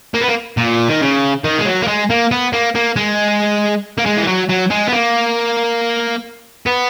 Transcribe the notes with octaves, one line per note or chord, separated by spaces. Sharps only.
A#3
B3
A#3
A#2
D#3
C#3
D#3
G#3
F#3
A#3
G#3
A#3
B3
A#3
A#3
G#3
A#3
G#3
E3
F#3
F#3
G#3
B3
A#3
B3